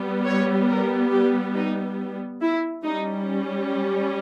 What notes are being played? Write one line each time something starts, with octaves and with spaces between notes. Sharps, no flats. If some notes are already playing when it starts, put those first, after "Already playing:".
Already playing: G3 B3
C#5
A#4
G4
D#4
E4
G3 C#4 D#4